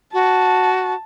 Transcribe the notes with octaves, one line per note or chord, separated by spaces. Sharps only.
F#4 A5